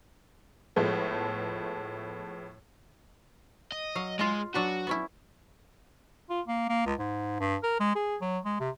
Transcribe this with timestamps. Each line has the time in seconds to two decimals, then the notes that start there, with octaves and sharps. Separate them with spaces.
0.76 A2 F3 G#3 A3 B3
3.72 D#5
3.95 F#3 F5
4.19 G#3 F4 D#5
4.55 F#3 D4 F#4 B4
4.87 B3 C#4 E4
6.30 F4
6.48 A#3
6.69 A#3
6.86 C#2
6.99 G#2
7.40 G2
7.63 A#4
7.80 G#3
7.95 G#4
8.21 F#3
8.45 G#3
8.60 C3